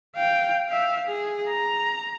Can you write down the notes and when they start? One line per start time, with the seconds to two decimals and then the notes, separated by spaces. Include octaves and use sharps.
0.15 F5 G5
0.69 E5 F5
1.07 G#4
1.48 A#5